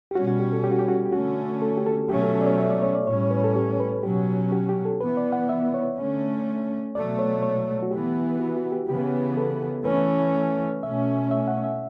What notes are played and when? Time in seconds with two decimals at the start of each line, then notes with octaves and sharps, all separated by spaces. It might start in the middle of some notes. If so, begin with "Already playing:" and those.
0.11 G4
0.15 B2 G3 C#4 F#4
0.27 F#4
0.40 G4
0.53 A4
0.64 G4
0.71 F#4
0.79 G4
0.88 F#4
1.06 G4
1.12 D3 A3 C#4 F#4
1.62 A4
1.77 G4
1.86 A4
2.09 B2 F#3 A3 C#4 G4
2.23 A4
2.35 A4
2.41 D5
2.47 C#5
2.58 E5
2.70 D5
2.82 C#5
2.95 D5
3.06 A2 G3 C#4 C#5
3.30 B4
3.44 A4
3.56 G4
3.80 B4
4.03 B2 F#3 C#4 G4
4.52 G4
4.69 G4
4.85 A4
5.01 E3 B3 B4
5.17 D5
5.32 F#5
5.49 E5
5.74 C#5
5.97 D3 A3 C#4
6.95 B2 F#3 A3 D5
7.19 C#5
7.43 C#5
7.83 F#4
7.91 E3 B3 G4
8.40 F#4
8.56 F#4
8.72 G4
8.89 C#3 E3 B3 G4
9.37 A4
9.85 E3 A3 C#4 B4
10.83 B2 A3 C#4 E5
11.31 E5
11.48 F#5
11.64 E5